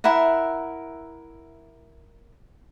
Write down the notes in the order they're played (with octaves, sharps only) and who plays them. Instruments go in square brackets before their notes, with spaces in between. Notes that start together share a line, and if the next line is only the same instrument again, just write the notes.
[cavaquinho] E4 A#4 E5 F#5